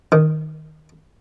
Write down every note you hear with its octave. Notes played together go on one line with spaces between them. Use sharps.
D#3